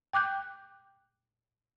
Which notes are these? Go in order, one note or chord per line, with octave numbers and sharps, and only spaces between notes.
G5 D6 F#6 G6